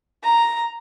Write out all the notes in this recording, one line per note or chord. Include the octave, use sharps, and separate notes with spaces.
A#5